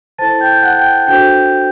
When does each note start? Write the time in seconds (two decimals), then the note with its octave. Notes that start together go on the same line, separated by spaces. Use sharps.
0.18 E4 A4 C5 A5 A6
0.40 G5 G6
0.52 G6
0.63 F#5 F#6
0.78 G5 G6
1.07 D4 F#4 A4 C5 G5 G6